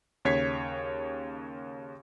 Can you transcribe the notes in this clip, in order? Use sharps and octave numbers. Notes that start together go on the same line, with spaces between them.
D#2 C#3 C#5 G#6 B6 C7